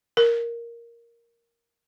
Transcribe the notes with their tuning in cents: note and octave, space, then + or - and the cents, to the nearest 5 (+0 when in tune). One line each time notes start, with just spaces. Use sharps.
A#4 +5